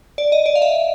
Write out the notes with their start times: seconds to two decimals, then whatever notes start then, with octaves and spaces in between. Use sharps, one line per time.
0.18 D5
0.32 D#5
0.46 D5
0.55 F5
0.62 E5